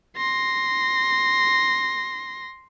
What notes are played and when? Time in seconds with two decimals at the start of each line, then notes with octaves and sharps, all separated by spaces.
0.17 C6 A#6